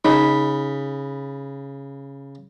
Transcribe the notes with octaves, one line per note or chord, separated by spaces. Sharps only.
C#3 D#4 B5